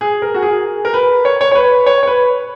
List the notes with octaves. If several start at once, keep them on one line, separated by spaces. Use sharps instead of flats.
G#4
A#4
F#4
G#4
A#4
B4
C#5
C#5
C#5
B4
C#5
C#5
B4